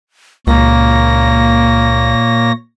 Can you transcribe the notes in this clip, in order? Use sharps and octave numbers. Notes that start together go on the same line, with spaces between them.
C#2 A#2 A#3 C#5 A#6